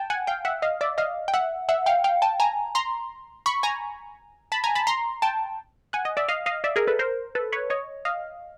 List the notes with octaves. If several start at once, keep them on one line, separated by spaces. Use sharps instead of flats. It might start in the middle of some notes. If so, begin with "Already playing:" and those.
Already playing: G5 A5
F#5 G#5
F5 G5
E5 F#5
D#5 F5
D5 E5
D#5 F5
G5
E5 F#5
E5 F#5
F5 G5
F5 G5
G5 A5
G#5 A#5
A#5 C6
B5 C#6
G#5 A#5
A5 B5
G#5 A#5
A5 B5
A#5 C6
G5 A5
F#5 G#5
D#5
D5 E5
D#5 F5
D#5 F5
D5 E5
G#4 A#4
A4 B4
A#4 C5
A4 B4
B4 C#5
C#5 D#5
D#5 F5